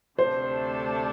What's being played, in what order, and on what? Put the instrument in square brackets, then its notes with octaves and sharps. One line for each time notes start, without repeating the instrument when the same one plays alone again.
[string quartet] D2 C3 A3 D4 A4 [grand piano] C5